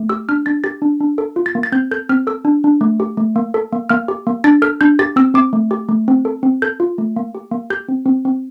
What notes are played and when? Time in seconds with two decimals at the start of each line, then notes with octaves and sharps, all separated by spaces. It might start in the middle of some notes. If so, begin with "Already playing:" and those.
Already playing: A3
0.09 G4 E6
0.29 D4 F6
0.46 D4 A6
0.64 G4 A6
0.82 D4
1.00 D4
1.18 A4
1.36 F4
1.46 A6
1.55 A#3
1.63 A6
1.72 C4 G6
1.91 A4 G6
2.09 C4 F6
2.27 A4 E6
2.45 D4
2.64 D4
2.81 A3
3.00 G4
3.17 A3
3.36 A#3
3.54 A4
3.73 A#3
3.90 A#3 F6
4.08 G4
4.27 A#3
4.44 D4 A6
4.62 A4 F6
4.81 D4 G6
4.99 G4 A6
5.16 C4 E6
5.34 C4 D6
5.53 A3
5.71 G4
5.89 A3
6.08 C4
6.25 A4
6.43 C4
6.62 A4 G6
6.80 F4
6.98 A3
7.16 A#3
7.35 G4
7.51 A#3
7.70 G4 G6
7.88 C4
8.06 C4
8.25 C4